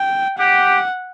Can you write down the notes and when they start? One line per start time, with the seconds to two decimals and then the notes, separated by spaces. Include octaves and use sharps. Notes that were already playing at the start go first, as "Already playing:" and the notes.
Already playing: G5
0.38 G4 F#5